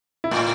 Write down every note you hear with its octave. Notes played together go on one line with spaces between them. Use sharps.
E4
A2 F4